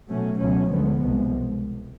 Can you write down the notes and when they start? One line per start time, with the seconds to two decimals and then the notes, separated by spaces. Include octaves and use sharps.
0.10 B2 F#3 A3 C#4
0.40 C#2 B2 F#3 A3 C#4
0.70 D2 D3 F3 G#3 B3
0.99 C2 B2 G#3